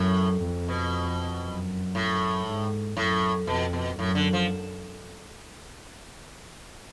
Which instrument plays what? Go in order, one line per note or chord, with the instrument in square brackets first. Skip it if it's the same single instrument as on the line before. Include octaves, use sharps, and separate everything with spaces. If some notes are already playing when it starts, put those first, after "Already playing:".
Already playing: [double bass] F#2 [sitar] A2
[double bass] F2
[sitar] B2
[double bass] F#2
[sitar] A2
[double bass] G#2
[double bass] F#2 [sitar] A2
[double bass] F2 [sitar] B2
[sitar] B2
[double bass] F#2 [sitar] A2
[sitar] D3
F3